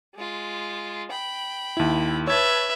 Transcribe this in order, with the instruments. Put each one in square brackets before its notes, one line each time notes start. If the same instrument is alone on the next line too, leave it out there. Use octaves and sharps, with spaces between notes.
[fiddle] G#3 F4
G5 B5
[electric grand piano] D#2 E4
[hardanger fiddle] B4 E5 [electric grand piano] C#5 G#6 [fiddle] A5